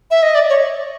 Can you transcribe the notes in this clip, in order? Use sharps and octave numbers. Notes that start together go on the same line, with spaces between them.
E5
D#5
D5
C#5